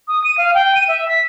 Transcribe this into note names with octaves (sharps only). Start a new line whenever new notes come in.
D#6
D#7
F5
G5
D#7
E5
B6